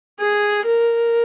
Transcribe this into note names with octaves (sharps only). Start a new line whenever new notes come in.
G#4
A#4